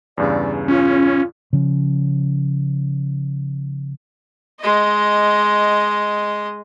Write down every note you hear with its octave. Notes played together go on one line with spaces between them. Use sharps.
E2 G2 C#3 D5
C#4 F4
C#3 F3 C#4
G#3 D#5